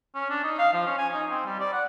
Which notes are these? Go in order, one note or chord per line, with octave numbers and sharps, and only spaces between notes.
C#4
D4
D#4
F5
F3
C#4
G#5
D#4
C4
G3
D5
F#5